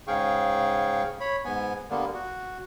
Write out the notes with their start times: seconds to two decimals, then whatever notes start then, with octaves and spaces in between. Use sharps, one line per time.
0.07 G#2 C#3 G#4 F5 G5 C#6
1.20 C#5 B5
1.45 G#2 B3 G#5
1.90 D3 G3 A#3 B3
2.14 F#4